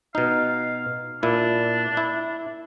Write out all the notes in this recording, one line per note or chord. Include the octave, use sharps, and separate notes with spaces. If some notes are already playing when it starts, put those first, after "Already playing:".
B2 D#4 F5
A#2 D4 E4
E4